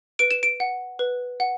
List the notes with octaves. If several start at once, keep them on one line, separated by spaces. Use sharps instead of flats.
B4 D7
E7
D7
F#5
B4
F#5